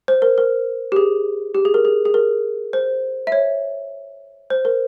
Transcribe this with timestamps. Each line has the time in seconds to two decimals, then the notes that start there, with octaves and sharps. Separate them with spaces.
0.08 C5
0.22 A#4
0.38 A#4
0.92 G4
0.96 G#4
1.55 G4
1.65 G#4
1.74 A#4
1.85 G#4
2.05 G#4
2.14 A#4
2.73 C5
3.27 E5
3.32 C#5
4.50 C5
4.65 A#4